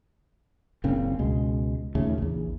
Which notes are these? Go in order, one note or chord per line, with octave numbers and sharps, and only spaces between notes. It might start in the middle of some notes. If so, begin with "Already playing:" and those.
F#1 A#2 C#3 C4
C#2 B2 G#3
D#2 A#2 C#3 A3
A#1 E2